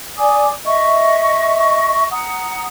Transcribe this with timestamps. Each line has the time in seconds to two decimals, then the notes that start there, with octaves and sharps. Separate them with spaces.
0.17 D5 G#5 D6 D#6
0.65 D#5 E5 C#6
2.11 F#5 A#5 D#6